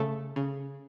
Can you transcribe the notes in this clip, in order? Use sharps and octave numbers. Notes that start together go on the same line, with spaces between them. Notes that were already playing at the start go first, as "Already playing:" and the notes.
Already playing: C#3 A3 A4
C#3